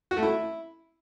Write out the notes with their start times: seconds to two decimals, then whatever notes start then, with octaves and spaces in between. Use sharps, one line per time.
0.11 F#4
0.17 A3
0.23 E4